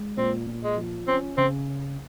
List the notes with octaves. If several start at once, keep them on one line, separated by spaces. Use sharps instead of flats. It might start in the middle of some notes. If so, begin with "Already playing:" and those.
Already playing: G#3
A#2 C4
A#2
G#3
F3
C4 C#4
C#3 C4